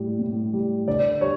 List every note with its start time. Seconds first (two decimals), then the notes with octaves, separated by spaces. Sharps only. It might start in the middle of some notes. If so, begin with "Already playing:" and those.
Already playing: A2 G3
0.19 A2
0.53 G3
0.87 D3 D5
1.21 G3 C#5